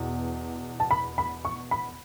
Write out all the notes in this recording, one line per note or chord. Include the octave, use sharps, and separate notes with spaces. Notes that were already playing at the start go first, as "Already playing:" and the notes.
Already playing: E2 B2
A5
B5
B5
C#6
B5